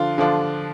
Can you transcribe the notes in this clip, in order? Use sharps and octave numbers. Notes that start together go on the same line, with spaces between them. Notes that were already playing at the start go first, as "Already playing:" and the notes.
Already playing: D3 F3 D4 F4
D3 F3 D4 F4